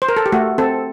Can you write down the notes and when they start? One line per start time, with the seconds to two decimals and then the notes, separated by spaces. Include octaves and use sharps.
0.02 C5
0.09 A#4
0.17 A4
0.26 G4
0.32 A3 F#4
0.58 C4 A4